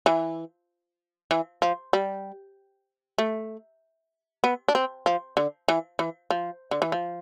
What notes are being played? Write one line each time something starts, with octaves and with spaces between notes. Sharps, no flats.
E3
E3
F3
G3
A3
B3
D4
C4
F3
D3
E3
E3
F3
D3
E3
F3